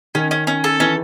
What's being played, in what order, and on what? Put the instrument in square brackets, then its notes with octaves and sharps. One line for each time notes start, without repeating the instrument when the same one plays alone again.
[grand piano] D#3 [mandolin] C#4
[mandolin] C#4
C#4
A4
[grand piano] E3 [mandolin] C#4